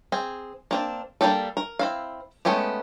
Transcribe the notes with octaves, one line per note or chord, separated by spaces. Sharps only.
C4 G#4
A#3 C4 D4
G3 A#3 D4 G4 A4
A#4
C4 E4 F5
G#3 A3 B3 C#4 G4